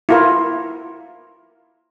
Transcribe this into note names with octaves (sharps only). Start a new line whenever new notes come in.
E4 F4 A#4